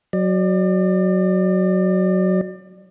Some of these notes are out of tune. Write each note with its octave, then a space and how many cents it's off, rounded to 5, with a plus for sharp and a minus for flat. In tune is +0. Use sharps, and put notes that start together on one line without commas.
F#3 +0 D5 +35